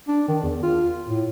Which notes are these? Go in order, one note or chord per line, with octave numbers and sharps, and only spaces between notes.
D4
D#3
E2
F4
A2